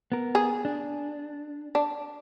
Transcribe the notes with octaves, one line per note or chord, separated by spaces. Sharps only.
B3 A#4
G#4
D4
D4